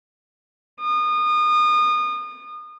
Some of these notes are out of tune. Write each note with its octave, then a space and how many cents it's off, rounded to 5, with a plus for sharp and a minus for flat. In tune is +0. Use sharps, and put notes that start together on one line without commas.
D#6 -30